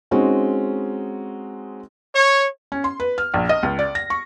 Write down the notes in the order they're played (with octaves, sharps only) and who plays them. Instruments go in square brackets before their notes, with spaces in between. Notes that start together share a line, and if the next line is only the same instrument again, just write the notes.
[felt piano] G#3 C4 C#4 D#4 F#4
[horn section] C#5
[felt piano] C#4
C6
B4
F6
A#1
D#5
C#2
D5
A#6
C#6